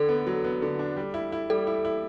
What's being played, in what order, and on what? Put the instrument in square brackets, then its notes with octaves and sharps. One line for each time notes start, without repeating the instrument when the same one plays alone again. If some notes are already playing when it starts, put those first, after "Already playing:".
Already playing: [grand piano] D3 [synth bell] A4
[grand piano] B3
F#3
B3
D3
D4
G3
E4
E4
[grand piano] G3 [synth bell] A4
[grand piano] E4
E4